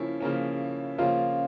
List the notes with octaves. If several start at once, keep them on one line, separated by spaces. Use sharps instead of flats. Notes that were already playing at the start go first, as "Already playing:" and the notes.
Already playing: C#3 F3 A#3 C#4 E4
C#3 F3 A#3 C#4
C#3 F3 A#3 C#4 F4